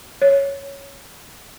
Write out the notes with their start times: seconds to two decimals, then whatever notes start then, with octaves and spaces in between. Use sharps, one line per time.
0.22 C#5